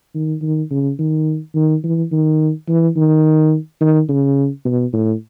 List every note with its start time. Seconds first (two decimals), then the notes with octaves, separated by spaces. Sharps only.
0.15 D#3
0.42 D#3
0.71 C#3
0.99 D#3
1.55 D#3
1.84 E3
2.11 D#3
2.68 E3
2.96 D#3
3.81 D#3
4.09 C#3
4.65 B2
4.93 A2